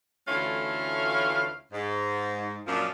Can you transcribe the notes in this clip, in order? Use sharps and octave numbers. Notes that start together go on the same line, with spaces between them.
D2 E3 A3 C#4 F4 F5
G#2
F#2 A#2 F3 D4 F4